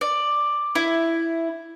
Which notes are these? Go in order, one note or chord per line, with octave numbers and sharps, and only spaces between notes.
D5
E4